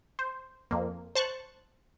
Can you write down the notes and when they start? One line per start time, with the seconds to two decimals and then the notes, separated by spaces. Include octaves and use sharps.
0.19 C5
0.71 F2 A#3
1.15 C5 A5 C#6 F#6